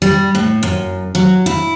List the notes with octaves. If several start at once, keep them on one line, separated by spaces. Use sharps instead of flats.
G3
A2
F#2
F#3
E4